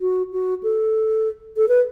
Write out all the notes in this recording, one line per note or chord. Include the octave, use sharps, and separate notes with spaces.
F#4
F#4
A4
A4
B4